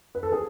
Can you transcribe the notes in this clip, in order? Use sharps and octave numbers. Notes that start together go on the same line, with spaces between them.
B4
A4
G#4